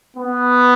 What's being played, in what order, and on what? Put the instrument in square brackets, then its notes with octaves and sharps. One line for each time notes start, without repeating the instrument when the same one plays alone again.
[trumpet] B3